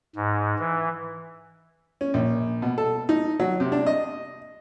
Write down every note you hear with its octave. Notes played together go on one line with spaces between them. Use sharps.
G#2
E3
C#4
A#1
B2
A4
D#4
F#3
C3
D4
D#5